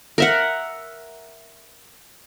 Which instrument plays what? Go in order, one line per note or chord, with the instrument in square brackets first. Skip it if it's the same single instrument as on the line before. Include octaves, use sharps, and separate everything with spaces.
[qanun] A#4 E5 F#5